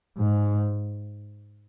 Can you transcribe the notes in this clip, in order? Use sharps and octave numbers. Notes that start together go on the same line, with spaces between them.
G#2